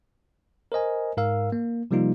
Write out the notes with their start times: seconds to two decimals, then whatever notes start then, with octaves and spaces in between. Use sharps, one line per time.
0.72 A#4 C5 D#5 G#5
1.17 G#2 A#4 F5 E6
1.52 A#3
1.91 C3 F3 G3 A#3 D#4 F4